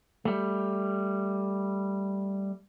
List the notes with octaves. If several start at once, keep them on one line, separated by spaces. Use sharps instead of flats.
G3 A3